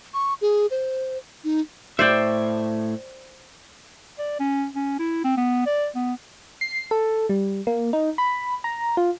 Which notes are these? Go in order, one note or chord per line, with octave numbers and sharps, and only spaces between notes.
C#6
G#4
C5
D#4
A2 C5 D5 E5 G5
D5
C#4
C#4
E4
C4
B3
D5
B3
C7
A4
G3
A#3
D#4
B5
A#5
F4